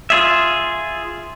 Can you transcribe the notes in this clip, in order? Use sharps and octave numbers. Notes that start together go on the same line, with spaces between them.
F4 G#4 E5